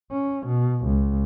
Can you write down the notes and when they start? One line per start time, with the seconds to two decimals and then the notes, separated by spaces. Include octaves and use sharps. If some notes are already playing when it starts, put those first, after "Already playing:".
0.11 C#4
0.46 B2
0.85 C#2